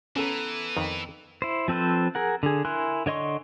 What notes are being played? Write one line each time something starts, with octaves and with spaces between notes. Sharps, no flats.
E3 B3 C#4 A4 A#5
F2 D#3
E4 C5
F3 C4 A4 B4 C5
G#4 A#4 F#5
D3 G#4
E4 A#4 G#5 C6 F#6
D3 C#5 D#5 C6 C#6